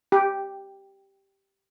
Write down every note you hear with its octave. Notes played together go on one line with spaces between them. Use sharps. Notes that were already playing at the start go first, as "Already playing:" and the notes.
G4